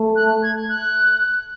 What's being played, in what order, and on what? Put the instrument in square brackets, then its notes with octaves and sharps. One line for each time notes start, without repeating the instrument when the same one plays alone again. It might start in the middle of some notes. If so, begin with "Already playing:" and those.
Already playing: [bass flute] A3
[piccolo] F#6
G#6
F#6